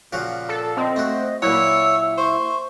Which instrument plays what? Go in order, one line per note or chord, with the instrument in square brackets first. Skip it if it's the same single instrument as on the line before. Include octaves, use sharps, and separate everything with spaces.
[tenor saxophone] A#2 [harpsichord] C#3 F3 F#4
[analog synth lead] A4
[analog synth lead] C4 [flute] D#5
[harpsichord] A3 F#4
[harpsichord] A#2 F#3 [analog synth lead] E4 [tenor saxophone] C#5 [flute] E6
[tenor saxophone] C5 [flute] C#6